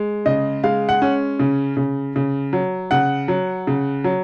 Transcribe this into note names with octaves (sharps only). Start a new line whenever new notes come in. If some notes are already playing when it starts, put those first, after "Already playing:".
Already playing: G#3
C#3 D#5
G#3 F5
F#5
C#4
C#3
C#3
C#3
F#3
C#3 F#5
F#3
C#3
F#3